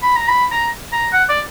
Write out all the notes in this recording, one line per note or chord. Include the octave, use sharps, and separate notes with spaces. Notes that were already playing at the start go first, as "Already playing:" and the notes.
B5
A#5
B5
A#5
A#5
F#5
D5